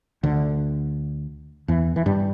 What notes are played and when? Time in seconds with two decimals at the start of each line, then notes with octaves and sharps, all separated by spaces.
0.23 D2 D3
1.68 E2 E3
1.96 E3
2.06 G2 G3